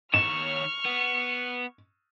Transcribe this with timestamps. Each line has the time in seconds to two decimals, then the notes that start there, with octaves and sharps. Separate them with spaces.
0.14 D#3 C#5 C#6 F6 E7
0.86 B3